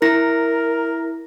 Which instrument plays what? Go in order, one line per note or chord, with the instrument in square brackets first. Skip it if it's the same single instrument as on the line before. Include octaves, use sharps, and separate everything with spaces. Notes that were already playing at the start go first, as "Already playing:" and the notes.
[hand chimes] E4 A#6 [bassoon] A#4